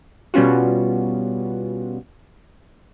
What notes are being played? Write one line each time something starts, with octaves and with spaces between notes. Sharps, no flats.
B2 G3 B3 C#4 F4 F#4